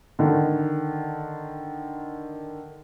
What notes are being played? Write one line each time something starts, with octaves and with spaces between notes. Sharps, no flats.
D3 D#3